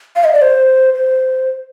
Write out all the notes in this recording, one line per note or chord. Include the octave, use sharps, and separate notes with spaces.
F5
D#5
D5
C5
C5